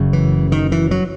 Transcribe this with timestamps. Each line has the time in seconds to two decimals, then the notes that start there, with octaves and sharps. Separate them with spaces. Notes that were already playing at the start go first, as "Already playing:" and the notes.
Already playing: F#1 F#2 C#3
0.13 E3
0.52 D#3
0.72 E3
0.91 F#3